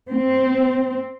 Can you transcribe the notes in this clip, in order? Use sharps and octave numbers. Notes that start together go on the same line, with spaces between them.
C4